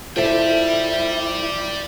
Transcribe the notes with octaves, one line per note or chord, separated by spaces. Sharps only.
E4 F4 A4 C5 D5 E5 G5